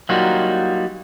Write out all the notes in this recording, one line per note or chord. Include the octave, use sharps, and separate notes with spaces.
F#3 G3 A#3 D#4 F4 F#4